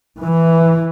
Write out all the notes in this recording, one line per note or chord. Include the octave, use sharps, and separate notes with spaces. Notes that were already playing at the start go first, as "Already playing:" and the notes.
E3